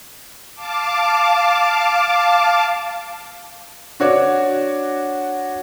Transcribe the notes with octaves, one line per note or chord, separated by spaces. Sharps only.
F5 A5 D6
D4 F#4 C#5 D5